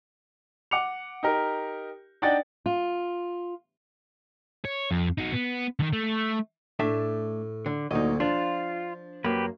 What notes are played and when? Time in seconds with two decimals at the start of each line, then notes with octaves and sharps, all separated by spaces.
0.71 F#5 D6 C#7 F7
1.23 D#4 G4 A#4
2.22 D4 D#4 D5 F#5 G5 A6
2.66 F4
4.65 C#5
4.91 F2
5.18 D#4 F#4
5.33 B3
5.79 D3 D#3
5.93 A3
6.79 A2 A3 D4 E5
7.66 D3
7.91 D2 A#2 F#3 D#4 D#5
8.20 F3 D4 F4
9.24 F#2 A#3 G4 B4